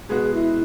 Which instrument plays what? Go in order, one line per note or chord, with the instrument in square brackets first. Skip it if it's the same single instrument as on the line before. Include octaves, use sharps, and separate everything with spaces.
[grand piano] B2 G#3 B3 F#4 [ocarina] G#4
[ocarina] E4